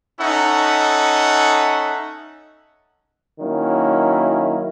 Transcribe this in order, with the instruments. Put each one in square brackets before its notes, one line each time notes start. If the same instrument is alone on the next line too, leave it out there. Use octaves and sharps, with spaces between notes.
[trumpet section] C#4 D#4 A4 E5 F#5
[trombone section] D#3 F#3 A#3 C#4 E4